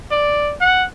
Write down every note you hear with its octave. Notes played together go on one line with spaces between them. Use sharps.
D5
F#5